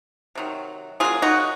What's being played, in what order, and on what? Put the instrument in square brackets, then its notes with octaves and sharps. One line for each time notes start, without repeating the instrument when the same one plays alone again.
[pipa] C3 D#3 F#3
C#3 F#3 A#3 F4 G#4
D#4 F#4